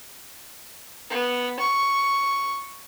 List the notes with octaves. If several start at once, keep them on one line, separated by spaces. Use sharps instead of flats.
B3
C#6